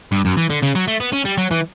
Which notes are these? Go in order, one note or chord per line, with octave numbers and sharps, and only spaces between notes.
G2
F#2
E3
D3
C#3
F#3
A3
B3
C#4
G3
F#3
E3